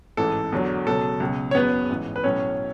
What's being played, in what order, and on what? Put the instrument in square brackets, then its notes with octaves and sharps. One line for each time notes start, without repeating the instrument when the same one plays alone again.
[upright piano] A1 G#2 E3 A4
E2 D3 F#3
C#2 B2 F#3 A4
C#2 B2 F#3
C#5
F#1 E2 C#3 F#3 B3 B4
A1 G#2 E3
B4
B1 A2 F#3 C#4 C#5